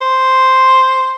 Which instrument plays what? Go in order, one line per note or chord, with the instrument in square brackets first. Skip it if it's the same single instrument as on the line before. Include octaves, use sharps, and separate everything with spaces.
[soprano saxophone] C5